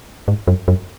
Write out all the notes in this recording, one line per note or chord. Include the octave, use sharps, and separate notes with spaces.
G#2
F#2
F#2